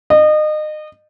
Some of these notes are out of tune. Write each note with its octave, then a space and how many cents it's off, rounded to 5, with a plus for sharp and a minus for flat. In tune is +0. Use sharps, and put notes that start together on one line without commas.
D#5 -30